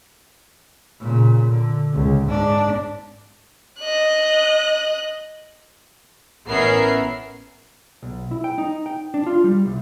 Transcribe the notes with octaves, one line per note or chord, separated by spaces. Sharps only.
A#2 C#3
D3
C#2
G#2 D4
D#5 F#6
A1 B3 C#4 A#4 E5 C7
B1
E4
G5
D#4
G5
D4
F4
G3
C2